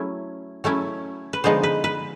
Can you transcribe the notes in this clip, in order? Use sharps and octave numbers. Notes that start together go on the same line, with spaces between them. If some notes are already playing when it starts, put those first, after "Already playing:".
Already playing: F#3 A3 C#4 E4
F#3 A3 C#4 E4
B4
D3 F3 G#3 B3 D#4 C5
B4
B4